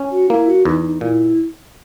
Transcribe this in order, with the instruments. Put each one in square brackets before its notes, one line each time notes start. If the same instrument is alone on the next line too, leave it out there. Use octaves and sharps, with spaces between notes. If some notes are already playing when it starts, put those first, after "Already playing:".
Already playing: [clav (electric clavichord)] C#4
[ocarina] F#4
[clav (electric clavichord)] A#3 [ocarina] E4
[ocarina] F#4
[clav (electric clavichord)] E2 [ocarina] D#4
[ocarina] D#4
[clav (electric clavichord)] A#2 [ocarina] E4